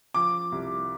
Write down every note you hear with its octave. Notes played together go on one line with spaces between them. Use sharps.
F3 D6
C2